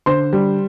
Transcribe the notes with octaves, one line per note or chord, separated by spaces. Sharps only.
D3 C5 C6
G3